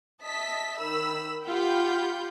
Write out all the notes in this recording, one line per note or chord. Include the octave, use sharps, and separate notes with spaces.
D#5 E5 A5 B6
D#3 B5 E6
F4 G4 F#5 G5 B5 G6